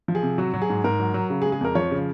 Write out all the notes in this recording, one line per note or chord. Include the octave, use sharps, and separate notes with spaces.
F3
G#4
C3
F#3 F#4
F#3
G#4
G#2
G#2 A#4
F#3
F#3
C#3
G#4
G#3
G#4
F2 A#4
F3 C#5
C#3